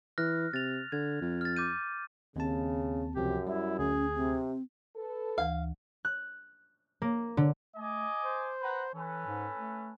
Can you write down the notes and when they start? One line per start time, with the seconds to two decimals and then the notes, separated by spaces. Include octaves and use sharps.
0.18 E3 F6 F#6 A#6
0.53 C3 A6 F7
0.92 D3 G#6
1.21 F2
1.41 F6 A6
1.56 D6 G6 D#7
2.36 D#2 C#3 C4 A5
3.16 C#2 F#2 C3 F3 G4
3.47 G3 E4 E5
3.79 D2 C#4 G#4
4.16 C3 C4
4.96 A4 B4
5.38 D2 E3 F5
6.05 F#6
7.02 A#3
7.37 D3
7.76 A3 D#5 G#5 D6
8.23 C5
8.62 B4 F#5 A#5
8.94 E3 C#4 A4 B4
9.26 G#2
9.56 A3